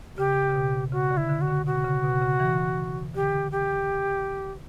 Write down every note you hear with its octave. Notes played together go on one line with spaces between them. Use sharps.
C#3 G4
C#3
B2
C#3 F#4
D3
E4
D3
F#4
D3
B2 F#4
C#3
B2
C#3
E3
D3 G4
G4